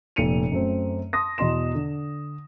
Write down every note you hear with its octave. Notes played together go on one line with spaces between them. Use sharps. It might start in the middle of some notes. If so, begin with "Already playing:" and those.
F1 A#2 C#7 D#7 F7
F#2 A3 C4
A5 C6 D#6 A#6
E2 B2 D#5 C6 E7
D3